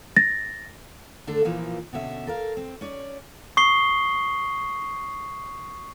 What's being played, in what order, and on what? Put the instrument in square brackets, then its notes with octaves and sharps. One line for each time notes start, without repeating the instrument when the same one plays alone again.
[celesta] A6 A#6
[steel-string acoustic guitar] D3 A3 D4 A4
A#2 E3 F3 A#3
B2 D3 C#4 E5
A4 A#4 F5
C4
C#4 C#5 D5
[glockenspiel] C#6 D#6 C7 G7